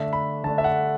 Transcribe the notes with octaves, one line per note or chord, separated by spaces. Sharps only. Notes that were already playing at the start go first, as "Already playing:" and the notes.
Already playing: D3 A3 D4 E5
B5
D3 A3 D4 A5
E5
F#5